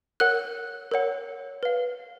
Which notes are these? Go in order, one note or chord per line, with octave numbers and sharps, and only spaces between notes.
A#4 C#5 F#5 F#6
A#4 C#5 F#5
B4 F5